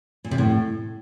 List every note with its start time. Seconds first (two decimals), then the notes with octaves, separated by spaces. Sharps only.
0.25 A#2
0.31 C3
0.38 A2